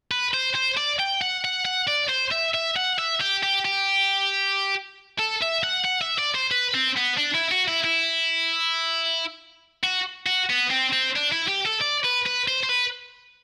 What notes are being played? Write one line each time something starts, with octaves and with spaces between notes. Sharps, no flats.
B4
C5
C5
D5
G5
F#5
F#5
F#5
D5
C5
E5
E5
F#5
E5
G4
G4
G4
A4
E5
F#5
F#5
E5
D5
C5
B4
C4
B3
D4
E4
F#4
E4
E4
F#4
F#4
B3
C4
C4
D4
E4
G4
A4
D5
B4
B4
C5
C5
B4